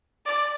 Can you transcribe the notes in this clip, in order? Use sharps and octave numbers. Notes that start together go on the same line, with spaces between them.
D5